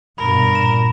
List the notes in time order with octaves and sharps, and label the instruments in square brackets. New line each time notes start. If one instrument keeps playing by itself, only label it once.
[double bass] G2 B2 [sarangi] A#4 [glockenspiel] B5
[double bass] A#2 [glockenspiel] E7